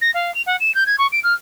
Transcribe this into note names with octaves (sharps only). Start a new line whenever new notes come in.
A#6
F5
F7
F#5
E7
G6
G#6
C#6
D7
F6